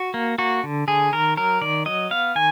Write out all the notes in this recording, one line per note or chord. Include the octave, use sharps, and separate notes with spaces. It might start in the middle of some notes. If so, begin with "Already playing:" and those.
Already playing: F#4
A#3
A#3 F#4
D3
D3 G#4
D#3 A#4
F#3 A#4
D#3 D5
F#3 D#5
B3 F5
D#3 G#5